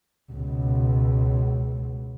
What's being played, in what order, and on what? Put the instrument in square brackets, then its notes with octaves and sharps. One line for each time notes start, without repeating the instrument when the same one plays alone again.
[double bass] C#2 B2